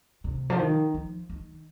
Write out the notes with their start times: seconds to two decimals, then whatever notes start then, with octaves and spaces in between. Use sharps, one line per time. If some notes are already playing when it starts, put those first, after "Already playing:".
0.24 C3
0.50 F3
0.59 D#3
0.94 F3
1.29 D#3